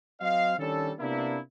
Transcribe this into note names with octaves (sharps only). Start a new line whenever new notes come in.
F#3 C4 D#5 F5
D#3 G3 C#4 D4 A4
C3 A#3 B3 D4 E4